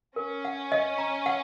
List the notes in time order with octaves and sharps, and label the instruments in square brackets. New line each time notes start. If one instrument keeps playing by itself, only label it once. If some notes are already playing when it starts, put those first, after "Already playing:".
[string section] C#4 [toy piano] A#4
[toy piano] F#5
D#5
A#5
F#5